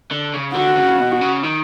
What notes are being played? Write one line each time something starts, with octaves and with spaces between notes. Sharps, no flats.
D3
C#3
D3 F#4
C#3
B2
C#3
D#3